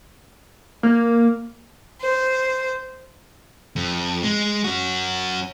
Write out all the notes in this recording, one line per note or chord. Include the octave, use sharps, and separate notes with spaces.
A#3
C5
F2
G#3
C#4 F#4